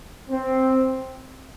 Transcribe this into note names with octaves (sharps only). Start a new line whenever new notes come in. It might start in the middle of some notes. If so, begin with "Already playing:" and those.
C4